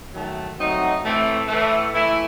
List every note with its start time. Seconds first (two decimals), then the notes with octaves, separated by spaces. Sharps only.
0.13 D#3 F#3 A3
0.57 F#3 A3 C4 D#4 F#4
1.03 A2 E3 A3 C4
1.48 A2 E3 A3
1.94 E3 A3 E4